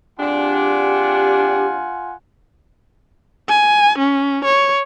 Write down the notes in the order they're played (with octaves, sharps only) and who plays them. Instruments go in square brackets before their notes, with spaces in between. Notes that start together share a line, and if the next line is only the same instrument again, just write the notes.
[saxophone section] C3 G#3 D4 [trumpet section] F4 F#5 G#5 [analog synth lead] G4
[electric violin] G#5
C#4
C#5